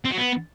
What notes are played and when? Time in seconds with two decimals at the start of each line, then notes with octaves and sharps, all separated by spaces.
0.05 C4
0.11 F#3
0.17 B3